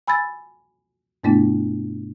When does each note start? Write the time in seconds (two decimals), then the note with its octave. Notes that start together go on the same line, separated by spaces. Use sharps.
0.08 G#5 B5 E6 G#6 A6
1.24 G2 B2 A3 B3 D4 E4